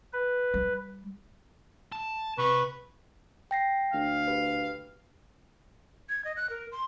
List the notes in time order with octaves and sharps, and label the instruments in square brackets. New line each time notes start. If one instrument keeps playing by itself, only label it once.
[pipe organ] B4
[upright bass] G3
[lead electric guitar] A5
[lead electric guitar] C3 [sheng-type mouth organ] B4 [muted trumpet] C#6
[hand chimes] G5 A#6 C7
[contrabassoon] D2 [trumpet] F5
[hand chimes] G4 B4
[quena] G#6
D#5
F#6
A#4
C6